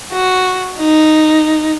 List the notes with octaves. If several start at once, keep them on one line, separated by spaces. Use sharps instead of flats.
F#4
D#4